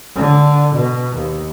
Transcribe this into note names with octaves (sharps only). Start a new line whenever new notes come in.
D3
B2
D#2